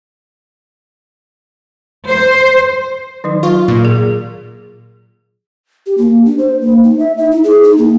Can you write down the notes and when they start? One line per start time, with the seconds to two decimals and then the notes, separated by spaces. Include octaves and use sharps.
2.08 C5
3.24 D#3 F#3 D#4
3.43 F4 C#6
3.68 A#2
3.85 G#4
5.86 G4
5.98 A#3
6.25 D4
6.38 C5
6.61 A#3
6.84 D#4
6.99 E5
7.18 D#4
7.32 E4
7.44 G#4
7.63 D#4
7.78 A#3